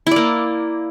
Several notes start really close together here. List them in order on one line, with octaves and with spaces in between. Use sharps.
E4 D5 A#3